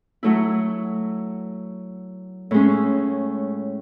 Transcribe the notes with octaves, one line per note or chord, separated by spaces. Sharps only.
F#3 A3 E4
A2 G#3 C#4